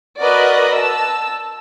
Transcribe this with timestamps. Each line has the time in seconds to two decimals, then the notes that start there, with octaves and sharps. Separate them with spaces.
0.21 F#4 A#4 B4 D5 D#5 F#6
0.73 A5 E6